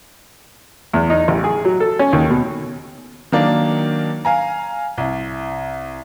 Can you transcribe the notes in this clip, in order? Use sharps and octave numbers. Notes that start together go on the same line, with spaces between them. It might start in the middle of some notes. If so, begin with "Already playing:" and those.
E2
D#4
A1
G#4
F#3
A4
C#4
D#2
B2
D#3 F#3 A#3 D4
F5 G#5 A#5
C2